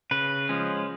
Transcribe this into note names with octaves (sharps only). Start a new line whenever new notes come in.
C#3 B4
F3 G#3 C#4